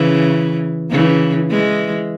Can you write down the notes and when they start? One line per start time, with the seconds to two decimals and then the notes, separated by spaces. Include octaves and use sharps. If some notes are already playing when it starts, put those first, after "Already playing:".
Already playing: C#3 E3
0.90 C#3 E3
1.50 E3 G#3